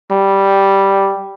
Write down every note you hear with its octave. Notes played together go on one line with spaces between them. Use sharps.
G3